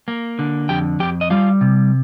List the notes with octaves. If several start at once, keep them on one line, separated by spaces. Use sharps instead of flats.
A#3
D3
F2 G4 G5
F2 G4 G5
D#5
G3 F4 F5
C3